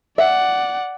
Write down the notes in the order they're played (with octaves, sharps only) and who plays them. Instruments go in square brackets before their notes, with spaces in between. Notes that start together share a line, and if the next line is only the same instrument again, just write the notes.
[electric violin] D5 F#5 [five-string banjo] E5